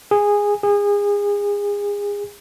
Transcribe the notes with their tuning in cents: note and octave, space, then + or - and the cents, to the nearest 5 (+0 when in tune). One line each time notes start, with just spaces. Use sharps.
G#4 -15
G#4 -30